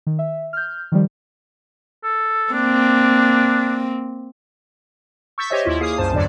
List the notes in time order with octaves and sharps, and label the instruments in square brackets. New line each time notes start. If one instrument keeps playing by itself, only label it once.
[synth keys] D#3
E5
F6 G6
D#3 F3 G3
[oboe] A4
[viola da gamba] A#3 C4 [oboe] D4
[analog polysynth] C#6 E6 G6 A6 B6
G4 C5 C#5 D#5 E5
D#2 E4 F4
A#3 G#4 F5 D#6 C7
C2 F#2 C5 A5
E2 G2 D3 F#3 D5